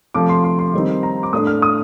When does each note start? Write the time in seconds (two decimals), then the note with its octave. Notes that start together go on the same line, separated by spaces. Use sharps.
0.14 C3 F3 A3 D6
0.29 C6
0.44 C6
0.59 C6
0.74 D#3 G3 C4 D#4
1.03 A#5
1.23 D6
1.32 A2 A3 D4 D#6
1.47 F6
1.62 D#6